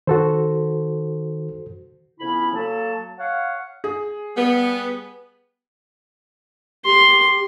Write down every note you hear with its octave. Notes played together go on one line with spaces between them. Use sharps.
D#3 F#4 A4 C5
F2 C#3 B3 C#4 E4 B5
F#3 A#3 A4 A5
C#5 F5 F#5
G#4
G3 B3
G4 C6